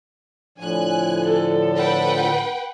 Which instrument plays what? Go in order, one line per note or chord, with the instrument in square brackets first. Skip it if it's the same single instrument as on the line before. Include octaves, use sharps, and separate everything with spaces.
[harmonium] A2 D3 F3 [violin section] G#5 F#6
[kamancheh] A4
[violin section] B4 F#5 G5